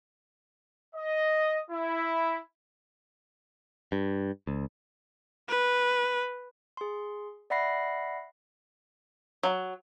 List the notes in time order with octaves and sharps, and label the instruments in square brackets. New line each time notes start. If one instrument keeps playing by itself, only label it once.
[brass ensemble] D#5
E4
[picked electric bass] G2
C#2
[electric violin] B4
[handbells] G#4 C6
D5 E5 F#5 B5 A#6 C7
[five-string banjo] F#3